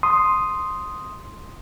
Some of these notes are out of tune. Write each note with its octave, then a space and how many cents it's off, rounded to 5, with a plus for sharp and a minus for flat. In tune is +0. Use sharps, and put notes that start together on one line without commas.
C6 +0 D#6 +0